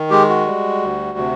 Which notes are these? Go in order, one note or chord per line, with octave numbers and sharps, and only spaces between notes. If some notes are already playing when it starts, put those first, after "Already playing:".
Already playing: D#3
G#3 G4
F#4
G3
D2
C3